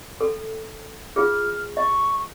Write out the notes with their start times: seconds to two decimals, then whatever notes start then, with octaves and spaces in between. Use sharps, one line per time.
0.21 A4
1.16 F4 G#4 F6
1.77 D#5 C#6